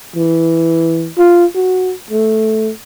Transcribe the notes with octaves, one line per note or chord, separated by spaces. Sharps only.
E3
F4
F#4
A3